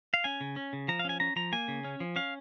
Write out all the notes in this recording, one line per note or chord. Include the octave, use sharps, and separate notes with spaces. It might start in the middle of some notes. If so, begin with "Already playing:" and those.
F5
C#4 G#5
C#3
C#4
C#3
F3 A#5
F5
C#4 G#5
C#4 A#5
F3 A#5
A#3 G#5
C#3
C#4
F3
C#4 F5